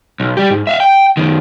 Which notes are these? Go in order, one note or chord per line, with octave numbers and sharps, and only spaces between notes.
B1
G3 G4
G#2
E5 F5
G5
F#2 D#3